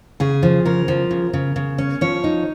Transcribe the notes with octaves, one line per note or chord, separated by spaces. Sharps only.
C#3 G#4
F3
C#3 A#4
F3
C#3
C#3
C#3
C#4
F3 C#5
D#4